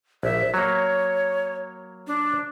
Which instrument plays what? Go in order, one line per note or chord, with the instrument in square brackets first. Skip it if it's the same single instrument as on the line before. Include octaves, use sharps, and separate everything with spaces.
[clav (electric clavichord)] A#1 [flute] E5
[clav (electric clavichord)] F#3 A#3 [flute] C#5
[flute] D4